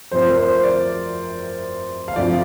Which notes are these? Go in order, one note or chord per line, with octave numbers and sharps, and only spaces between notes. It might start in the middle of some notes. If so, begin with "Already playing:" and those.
F1 F2 C3 F3 C5
A#4
C5
D5
F5
D2 C3 F3 D5